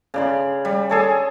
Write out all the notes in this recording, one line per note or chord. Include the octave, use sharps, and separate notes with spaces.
C#3 D5 C6
G3
G#4 A4 C#5